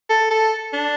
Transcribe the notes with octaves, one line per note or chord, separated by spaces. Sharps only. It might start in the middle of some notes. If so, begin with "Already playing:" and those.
A4
A4
D4